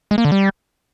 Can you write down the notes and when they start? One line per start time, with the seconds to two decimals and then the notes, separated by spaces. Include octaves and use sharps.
0.11 G#3
0.18 A#3
0.25 D3
0.32 G3